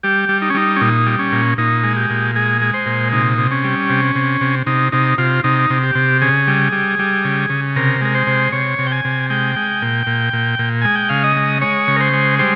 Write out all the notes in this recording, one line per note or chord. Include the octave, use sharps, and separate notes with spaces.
G3 G4
G3
D#4
C#4
G3 D#4
C#4
A#2 D#4
G3
C#4
A#2
A#2 D#4
G#3
G4
A#2
G#3 G#4
G#3
C5
A#2
C3 D#4
C3
C#4
G3
C3
C3
C3
C3 D#4
C3 D#4
C3 F4
C3 D#4
C3
G4
C3
C#3 G#4
G3
G3
G3
C#3
C#3
C3 A#4
G#3 A#4
C5
C3
C3 C#5
C3
G5
G#5
C3
G#3 G5
G#3
A#2
A#2
A#2
A#2
G#3 G#5
G5
C#3 F5
D#5
G#3
G#3 C#5
C#3
A#4
C5
G#3
G3 C5